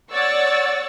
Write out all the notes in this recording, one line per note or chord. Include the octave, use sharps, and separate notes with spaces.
C#5 D5 F#5 C#6 E6 A6